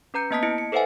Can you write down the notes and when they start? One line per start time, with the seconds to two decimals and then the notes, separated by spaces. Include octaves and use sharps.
0.14 C#4 B4 A#5 G6 C#7
0.31 A#3 B3 D#5 A5 D#6 B6
0.43 E4 D#5 C#7 D7
0.58 C#7
0.72 A4 B4 C5 E5 F#5 G#5